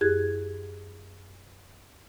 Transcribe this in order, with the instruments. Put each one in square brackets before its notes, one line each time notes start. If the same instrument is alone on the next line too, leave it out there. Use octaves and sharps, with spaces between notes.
[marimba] F#2 E4 G4 G#4 F#6 G#6